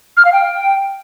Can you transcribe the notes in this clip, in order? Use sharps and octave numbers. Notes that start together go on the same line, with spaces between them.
F6
F5
G5